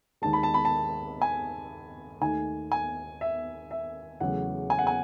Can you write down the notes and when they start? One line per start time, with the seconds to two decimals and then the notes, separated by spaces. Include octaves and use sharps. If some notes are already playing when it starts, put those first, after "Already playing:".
0.22 D#2 D#3 G#3 A5
0.33 B5
0.43 A5
0.54 B5
0.65 A5
1.22 G#5
2.21 D#2 D#3 A3 G#5
2.72 G#5
3.21 E5
3.71 E5
4.20 E2 C#3 F#3 A3 C#4 F#5
4.70 G#5
4.79 F#5
4.87 G#5